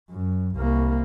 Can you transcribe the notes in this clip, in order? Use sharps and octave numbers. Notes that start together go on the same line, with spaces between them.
F#2
C2 A#3